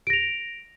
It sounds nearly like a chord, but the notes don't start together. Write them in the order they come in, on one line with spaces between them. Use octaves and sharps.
D7 A#6 F7